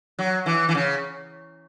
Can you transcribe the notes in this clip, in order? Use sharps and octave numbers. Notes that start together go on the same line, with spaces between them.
F#3
E3
E3
C#3